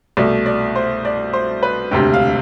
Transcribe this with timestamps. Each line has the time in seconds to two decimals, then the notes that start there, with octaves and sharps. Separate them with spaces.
0.17 C2 B2 A3 D5
0.46 D5
0.76 C5
1.05 D5
1.33 C5
1.63 B4
1.91 E1 D2 C3 G4
2.14 F5